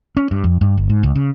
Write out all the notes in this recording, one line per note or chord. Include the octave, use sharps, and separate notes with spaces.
C#4
G2
F2
G2
G1
G#2
C#2
C#3